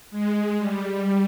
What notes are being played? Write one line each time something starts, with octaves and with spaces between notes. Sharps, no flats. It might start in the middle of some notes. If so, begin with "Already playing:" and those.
G#3
G3